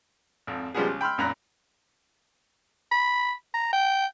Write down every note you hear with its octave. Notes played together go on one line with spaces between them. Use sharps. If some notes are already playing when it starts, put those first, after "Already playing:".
G#1 F2
C#3 F3 G3 G#3 B3 G#4
C#2
G5 B5 C6 E6 F6
G#1 F#2 A#2 A#5 B5 F#6
B5
A#5
G5